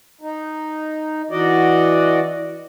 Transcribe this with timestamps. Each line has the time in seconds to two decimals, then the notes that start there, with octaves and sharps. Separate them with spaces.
0.21 D#4
1.31 E3 F#4 D5 D#5